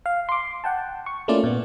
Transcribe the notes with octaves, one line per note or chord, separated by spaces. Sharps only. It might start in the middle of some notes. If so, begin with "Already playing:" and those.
F5
C6 D6
F#5 G5 A5
C#6
A3 A#3 C#4 E4 F4 D5
A#2 B3